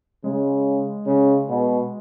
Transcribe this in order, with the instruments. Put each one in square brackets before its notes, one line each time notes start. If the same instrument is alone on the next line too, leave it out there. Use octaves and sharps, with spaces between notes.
[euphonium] C#3 [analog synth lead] G#3
[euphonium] C#3
B2